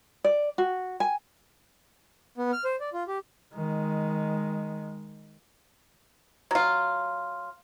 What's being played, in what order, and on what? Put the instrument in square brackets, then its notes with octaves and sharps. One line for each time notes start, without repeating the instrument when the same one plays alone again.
[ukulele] D5
F#4
G#5
[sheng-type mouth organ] B3
F6
C5
D5
F4
G4
[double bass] D#3 G#3
[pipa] F#3 F4